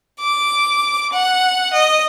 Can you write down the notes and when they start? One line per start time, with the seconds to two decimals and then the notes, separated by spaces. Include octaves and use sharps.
0.20 D6
1.13 F#5
1.74 D#5